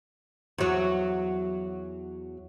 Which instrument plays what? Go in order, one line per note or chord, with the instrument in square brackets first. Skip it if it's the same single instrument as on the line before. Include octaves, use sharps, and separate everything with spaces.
[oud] E2 F#3